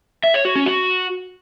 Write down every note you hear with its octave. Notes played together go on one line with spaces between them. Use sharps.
E5
C#5
F#4
C#4
F#4